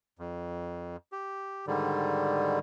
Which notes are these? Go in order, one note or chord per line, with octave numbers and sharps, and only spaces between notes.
F2
G4
G#2 D3 D#3 G3